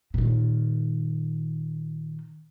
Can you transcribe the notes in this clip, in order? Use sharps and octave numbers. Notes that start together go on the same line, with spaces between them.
A#2 D#3